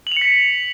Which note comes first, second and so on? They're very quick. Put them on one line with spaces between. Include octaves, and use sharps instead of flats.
F#7 F7 C#7 B6